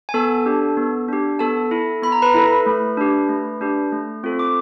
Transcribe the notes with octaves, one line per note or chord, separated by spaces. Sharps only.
G#5
B3 A4 A5
D4 G4
B3
D4 G4
B3 A4 A5
E4 A4
B3 B5
A#5
B4 B5
E4 A4
A3
D4 G4
A3
D4 G4
A3
C4 F4 A4
D6